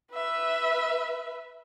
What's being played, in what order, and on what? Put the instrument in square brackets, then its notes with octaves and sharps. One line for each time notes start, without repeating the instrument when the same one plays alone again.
[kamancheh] B4 E5